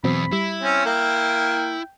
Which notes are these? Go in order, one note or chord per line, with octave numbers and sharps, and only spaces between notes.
E2 B2 F#3 C4 B5
G3 E4
C4 C#4
A#3 G5